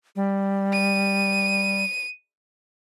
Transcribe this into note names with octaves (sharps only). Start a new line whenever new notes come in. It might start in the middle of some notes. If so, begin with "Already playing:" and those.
G3
D#7